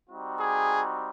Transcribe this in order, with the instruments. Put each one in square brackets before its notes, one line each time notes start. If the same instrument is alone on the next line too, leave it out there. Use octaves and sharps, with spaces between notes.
[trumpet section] G3 C4 D#4 F#4
G#4